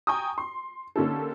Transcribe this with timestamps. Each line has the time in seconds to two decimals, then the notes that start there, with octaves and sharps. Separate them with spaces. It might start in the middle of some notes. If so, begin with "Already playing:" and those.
0.07 G5 G#5 A#5 C#6 D#6
0.38 C6
0.96 D3 A#3 C#4 D#4 G4 A4